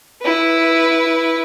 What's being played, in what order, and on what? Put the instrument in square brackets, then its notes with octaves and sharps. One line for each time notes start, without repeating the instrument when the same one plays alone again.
[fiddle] E4 B4